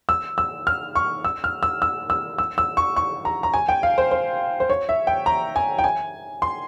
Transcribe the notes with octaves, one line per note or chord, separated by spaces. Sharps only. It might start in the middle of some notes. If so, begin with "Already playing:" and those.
E6
E6
F6
C#6
E6
F6
E6
E6
E6
E6
E6
C#6
C#6
A#5
A#5
G#5
G5
F5
C5
C5
C5
C#5
E5
G5
A#5
G#5
G5
G#5
C6